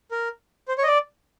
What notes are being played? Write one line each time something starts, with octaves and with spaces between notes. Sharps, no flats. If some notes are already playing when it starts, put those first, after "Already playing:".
A#4
C5
C#5
D#5
D5